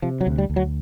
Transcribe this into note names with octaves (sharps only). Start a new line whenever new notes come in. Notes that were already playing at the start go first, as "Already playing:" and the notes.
C3 F3
F#3
D2
G3
D2
F#3